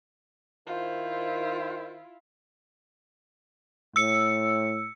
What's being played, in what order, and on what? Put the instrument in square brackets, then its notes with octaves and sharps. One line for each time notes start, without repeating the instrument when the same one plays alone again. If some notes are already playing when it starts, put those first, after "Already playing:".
[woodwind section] D#3 C5 [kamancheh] E4 F4
[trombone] A2 [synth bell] E6 C#7